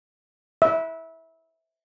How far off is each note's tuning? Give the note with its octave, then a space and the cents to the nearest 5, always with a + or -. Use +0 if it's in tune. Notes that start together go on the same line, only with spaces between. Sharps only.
E5 -15